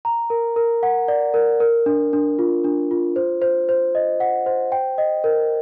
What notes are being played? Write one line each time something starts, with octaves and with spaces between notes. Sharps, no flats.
A#5
A#4
A#4
F#5
D5
A#4
A#4
D4
D4
F4
D4
F4
C5
C5
C5
D#5
F#5
C5
G5
D#5
A#4